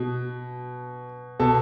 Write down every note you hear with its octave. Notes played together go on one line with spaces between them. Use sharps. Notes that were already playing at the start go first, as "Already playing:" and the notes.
Already playing: B2
B2 A4